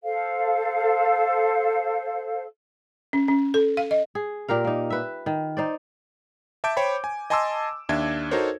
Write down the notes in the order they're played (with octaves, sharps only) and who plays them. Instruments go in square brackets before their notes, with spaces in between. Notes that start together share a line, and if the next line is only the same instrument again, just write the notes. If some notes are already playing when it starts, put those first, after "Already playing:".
[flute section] A4 C5 F5
[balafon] C#4
C#4
A4
F5
D#5
[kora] G#4
A#2 G4 A#4 F5
A#3 D#4
B4 E5
D#3
D#4 C5 D5
[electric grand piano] E5 A5 D6 G6 D7
C5 C#5 G5 B5
G#5
D#5 G#5 A5 C6 D6 E6
D#2 D4 E5 G#6
D#4 F#4 A4 A#4 C5 C#5